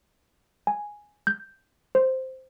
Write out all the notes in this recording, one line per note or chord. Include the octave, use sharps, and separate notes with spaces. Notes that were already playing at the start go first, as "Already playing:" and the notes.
G#5
G6
C5